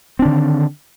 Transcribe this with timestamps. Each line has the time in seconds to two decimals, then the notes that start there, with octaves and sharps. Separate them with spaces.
0.19 C4
0.22 D4
0.25 D3
0.28 D#3